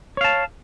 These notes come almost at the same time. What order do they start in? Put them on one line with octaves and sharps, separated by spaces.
C#5 F5 A5